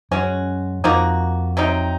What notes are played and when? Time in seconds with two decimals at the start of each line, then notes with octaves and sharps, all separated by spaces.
0.11 F#2 G#3 C#4 F#4
0.84 F2 F3 A#3 D#4 F#4
1.57 C3 F#3 C4 D#4